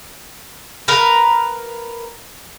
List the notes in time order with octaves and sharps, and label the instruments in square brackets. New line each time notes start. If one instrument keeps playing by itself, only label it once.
[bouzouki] A#4 B4 F5 A#5